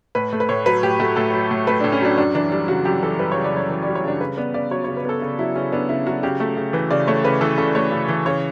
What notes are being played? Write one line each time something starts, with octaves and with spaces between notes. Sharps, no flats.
A2 B4
A3
B4
A2 C#5
F#3 B4
A2 G4
A3 F#4
A2 A4
F#3
A2
A3 B4
A2 D4
C#4
F#3 D4
F#2 D4
E3 D4
G3 D4
C#3 F#4
F#2 G4
E3 A4
G3 B4
C#3 C#5
D5
F#2 C#5
E3
G3 D5
C#5
C#3 D4
C#3 B4
B3 D5
C#3 D5
F#3 C#5
C#3 C#5
B4
B3 A4
C#3
F#3 E4
C#3 C#4
B3 D4
C#3 E4
F#3 F#4
C#3 G4
A3
C#3
E3 B4
C#3 D5
A3 C#5
C#3 B4
E3 A4
C#3 A4
A3 C#5
C#3
E3
C#3 C#5